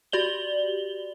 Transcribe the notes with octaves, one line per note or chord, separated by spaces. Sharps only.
F#4 G4 D5 F#7 G7